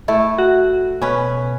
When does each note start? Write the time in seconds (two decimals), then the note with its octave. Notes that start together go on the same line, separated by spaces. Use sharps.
0.08 A3 E4
0.38 F#4
1.02 B2 C#4 B4